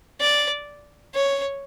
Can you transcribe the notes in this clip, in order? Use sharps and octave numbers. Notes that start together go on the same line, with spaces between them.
D5
C#5